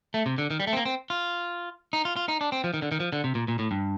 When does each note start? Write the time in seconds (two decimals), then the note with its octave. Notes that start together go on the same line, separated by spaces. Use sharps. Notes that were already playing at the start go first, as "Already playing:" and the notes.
0.14 A3
0.26 C3
0.38 D3
0.50 D#3
0.60 G3
0.67 A3
0.73 C4
0.77 A#3
0.85 C4
1.10 F4
1.93 D#4
2.05 F4
2.16 F4
2.28 D#4
2.41 D4
2.52 C4
2.64 F3
2.74 D#3
2.82 D3
2.92 D#3
3.00 F3
3.13 D3
3.24 C3
3.35 A#2
3.48 A#2
3.59 A2
3.71 G2